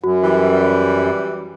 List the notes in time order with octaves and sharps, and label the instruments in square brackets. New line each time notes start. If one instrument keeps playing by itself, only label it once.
[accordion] F#2 [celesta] F#4
[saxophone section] E3 G3